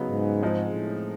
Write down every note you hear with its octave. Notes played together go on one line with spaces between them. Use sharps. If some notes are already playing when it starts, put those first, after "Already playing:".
Already playing: C#3 F#3 B3 D#4
G#2
F3 G#3 C4 D#4
A2